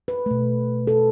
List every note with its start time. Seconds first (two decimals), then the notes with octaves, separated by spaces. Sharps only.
0.08 B4
0.26 B2 A3
0.87 A4